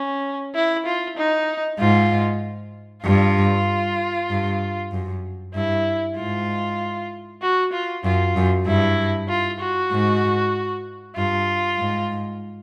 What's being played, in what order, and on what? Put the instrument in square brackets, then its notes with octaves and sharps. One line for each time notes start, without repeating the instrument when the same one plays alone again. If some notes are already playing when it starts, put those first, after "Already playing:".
Already playing: [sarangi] C#4
E4
F4
D#4
[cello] G#2 [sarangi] F4
[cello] G2 [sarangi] F4
[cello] G2
F#2
[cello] G2 [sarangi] E4
[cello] G#2 [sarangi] F4
[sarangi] F#4
F4
[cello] F#2 [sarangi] F4
[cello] F#2
[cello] G2 [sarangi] E4
[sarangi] F4
F#4
[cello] G#2
[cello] G2 [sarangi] F4
[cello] G#2